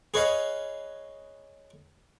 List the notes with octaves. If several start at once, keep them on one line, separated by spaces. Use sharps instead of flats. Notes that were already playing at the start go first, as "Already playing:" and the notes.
G#4 B4 C#5 D#5 F5